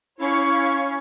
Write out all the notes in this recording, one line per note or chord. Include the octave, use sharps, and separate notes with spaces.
C#4 E4 C#5 F5 C#6